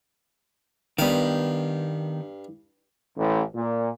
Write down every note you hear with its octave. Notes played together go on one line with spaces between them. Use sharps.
G2 D#3 B3 F5
A1
A#2